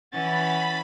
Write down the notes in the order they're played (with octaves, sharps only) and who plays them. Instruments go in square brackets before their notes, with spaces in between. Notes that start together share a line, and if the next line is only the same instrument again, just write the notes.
[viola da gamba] E3 [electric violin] C#4 A6 [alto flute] F#5 [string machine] B5